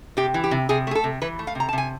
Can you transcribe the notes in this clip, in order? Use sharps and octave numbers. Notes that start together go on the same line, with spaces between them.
C3 G4
E3
G4
C3
C3 G#4
A3 G#4
A4
C3
E3 B4
A3
F5
C3 A#5
A5
C3 G#5